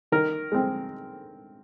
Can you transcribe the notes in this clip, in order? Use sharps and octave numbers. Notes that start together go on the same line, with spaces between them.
D#3 A#4
G#3 C4